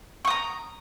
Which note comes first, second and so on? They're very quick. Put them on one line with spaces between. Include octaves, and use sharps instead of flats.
C#6 D#6 A#5